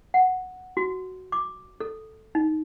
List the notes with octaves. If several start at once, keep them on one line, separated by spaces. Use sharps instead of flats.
F#5
F#4
D6
A4
D#4